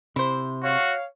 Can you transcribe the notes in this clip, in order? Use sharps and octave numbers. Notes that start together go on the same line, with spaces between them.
C3 E4 C5
F#4 C#5 F5